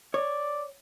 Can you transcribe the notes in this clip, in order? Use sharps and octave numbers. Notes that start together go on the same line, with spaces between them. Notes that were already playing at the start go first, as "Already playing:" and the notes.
C#5 D5